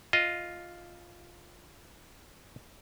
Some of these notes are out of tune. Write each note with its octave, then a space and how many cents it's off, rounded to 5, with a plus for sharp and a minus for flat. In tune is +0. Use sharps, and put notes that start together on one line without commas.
F4 +0 D#5 +0